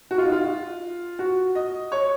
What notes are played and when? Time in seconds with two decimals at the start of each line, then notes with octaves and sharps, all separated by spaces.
0.11 F#4
0.18 F4
0.25 D#4
0.32 F4
1.19 F#4
1.55 D#5
1.92 C#5